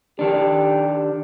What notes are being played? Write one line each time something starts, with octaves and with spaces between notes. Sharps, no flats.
D#3 D4 G4